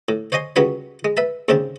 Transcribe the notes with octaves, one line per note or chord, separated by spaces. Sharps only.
A2
C5 C#5 D#5 G#5 C6
C#2 F#2 G3 F#4 B4 C#5
G#3
B4 E5 A5
D#2 G#2 C#3 C4 D4 A5